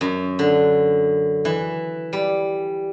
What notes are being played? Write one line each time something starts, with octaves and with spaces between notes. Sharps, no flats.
F#2
D3
E3
G3